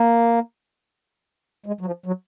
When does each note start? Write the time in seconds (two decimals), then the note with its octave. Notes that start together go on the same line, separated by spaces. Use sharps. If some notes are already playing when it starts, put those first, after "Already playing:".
Already playing: A#3
1.66 G#3
1.81 F#3
1.86 F3
2.06 F#3